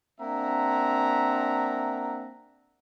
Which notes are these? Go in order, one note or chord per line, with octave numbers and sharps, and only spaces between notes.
A#3 C4 D4 E5 F#5 A#5